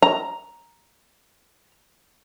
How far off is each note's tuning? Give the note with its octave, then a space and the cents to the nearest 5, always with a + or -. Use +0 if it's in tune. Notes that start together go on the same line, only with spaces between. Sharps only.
A#5 +5